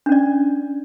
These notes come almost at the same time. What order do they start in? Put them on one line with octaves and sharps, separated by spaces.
D4 C#4 D5